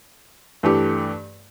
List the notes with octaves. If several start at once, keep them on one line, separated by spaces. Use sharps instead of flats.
G2 E3 A3 G4